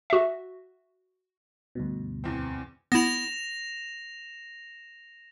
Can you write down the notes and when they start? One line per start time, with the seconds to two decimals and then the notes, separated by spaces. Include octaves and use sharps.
0.10 F#4 E5
1.75 D2 G2 B2
2.24 E2 C4
2.92 B3 E4 A#6 E7 F7